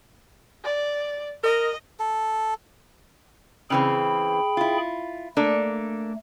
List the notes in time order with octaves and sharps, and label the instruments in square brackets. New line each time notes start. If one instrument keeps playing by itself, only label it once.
[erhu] D5
[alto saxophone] A#4 [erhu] D#5
[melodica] A4
[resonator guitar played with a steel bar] C#3 E3 C4 [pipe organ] G#4 G5 B5
[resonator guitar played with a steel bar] E4 F4
[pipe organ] A3 [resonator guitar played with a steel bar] A#3 D4 A4